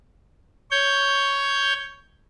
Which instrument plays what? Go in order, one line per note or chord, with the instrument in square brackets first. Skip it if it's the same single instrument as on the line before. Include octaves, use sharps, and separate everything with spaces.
[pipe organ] C#5 G6